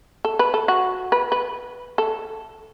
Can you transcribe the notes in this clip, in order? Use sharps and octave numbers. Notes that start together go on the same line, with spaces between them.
A4
B4
A4
F#4
B4
B4
A4